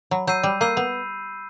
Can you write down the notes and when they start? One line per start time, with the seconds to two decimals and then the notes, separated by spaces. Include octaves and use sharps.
0.11 F#3 B5
0.27 F#3 E6 G6 C7 D#7
0.43 G3 B5
0.61 A#3 E6 G6 C7 D#7
0.77 B3 B5